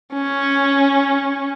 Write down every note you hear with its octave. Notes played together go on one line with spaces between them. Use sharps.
C#4